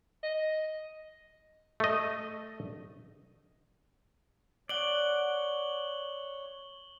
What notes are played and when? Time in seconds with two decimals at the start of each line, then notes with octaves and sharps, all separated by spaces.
0.23 D#5
1.80 A3 D#5
4.69 C#5 D5 F#5 F#7 G7